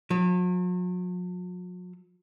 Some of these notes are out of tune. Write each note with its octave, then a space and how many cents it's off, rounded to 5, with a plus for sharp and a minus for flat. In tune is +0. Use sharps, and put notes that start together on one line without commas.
F#3 -45